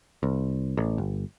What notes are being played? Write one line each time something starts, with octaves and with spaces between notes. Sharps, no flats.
C2
A1
G1